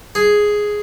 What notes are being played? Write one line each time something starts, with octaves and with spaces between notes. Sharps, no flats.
G#4